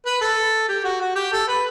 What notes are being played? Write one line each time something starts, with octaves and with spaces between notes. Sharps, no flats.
B4
A4
G4
F#4
F#4
G4
A4
B4